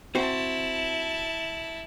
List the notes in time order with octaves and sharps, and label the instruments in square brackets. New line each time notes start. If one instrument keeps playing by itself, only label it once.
[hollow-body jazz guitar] C4 F#4 C5 [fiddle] E4 A5